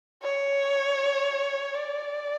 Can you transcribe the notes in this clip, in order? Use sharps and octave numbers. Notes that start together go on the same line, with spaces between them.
C#5
D5